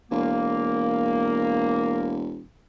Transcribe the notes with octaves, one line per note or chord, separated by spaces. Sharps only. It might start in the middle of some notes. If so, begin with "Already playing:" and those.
E1 A#3